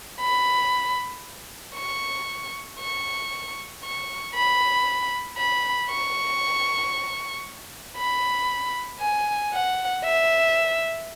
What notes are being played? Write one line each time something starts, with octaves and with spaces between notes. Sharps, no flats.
B5
C#6
C#6
C#6
B5
B5
C#6
B5
G#5
F#5
E5